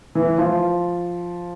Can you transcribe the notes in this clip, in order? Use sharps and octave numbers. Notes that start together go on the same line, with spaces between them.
E3
F3